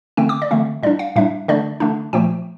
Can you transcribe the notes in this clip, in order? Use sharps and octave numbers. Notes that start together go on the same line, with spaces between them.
D3 A3 C4 G5
D6
D5
D3 A3 C4 E5
A2 G3 D4 D5
F5
A2 G3 D4 E5
D3 A3 D4 D5
D3 A3 D4
A#2 F3 A3 G5